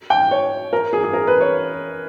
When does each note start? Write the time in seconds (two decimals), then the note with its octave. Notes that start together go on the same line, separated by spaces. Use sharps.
0.10 G5
0.31 C#5
0.73 A#4
0.93 G#4
1.04 G#4
1.13 A#4
1.27 B4
1.41 C#5